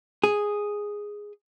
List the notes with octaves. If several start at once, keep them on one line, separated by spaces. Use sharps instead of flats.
G#4